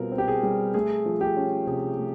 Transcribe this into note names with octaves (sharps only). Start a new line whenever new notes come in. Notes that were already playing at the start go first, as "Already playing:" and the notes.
Already playing: B2 G3 C4 F4 A#4
C4
G4
G#4
G3
A3 G#4
F3
G4
C#4
C3 G#4
A3